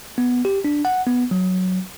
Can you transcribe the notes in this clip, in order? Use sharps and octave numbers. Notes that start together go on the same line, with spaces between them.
B3
G4
D4
F#5
B3
F#3